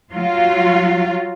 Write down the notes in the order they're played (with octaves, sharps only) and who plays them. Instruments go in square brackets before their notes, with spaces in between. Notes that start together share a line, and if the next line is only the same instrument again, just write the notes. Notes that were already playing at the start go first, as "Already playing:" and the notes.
[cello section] F#3 F4